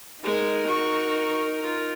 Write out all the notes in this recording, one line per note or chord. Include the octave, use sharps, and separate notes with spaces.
G#3 D#4 G#4 A#4
F#4 C#6
F4